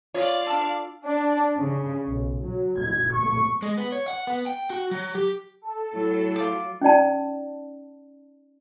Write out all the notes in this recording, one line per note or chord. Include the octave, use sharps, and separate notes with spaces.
F4 C#5 D5 F5
D4 A4
D4
C#3
B1
F#3
G#6
C#6
G#3
B3
C#5
F#5
B3
G5
F#4
F#3
G4
A4
A2 F#3
F4 C5 D6
C#4 D#4 D5 A5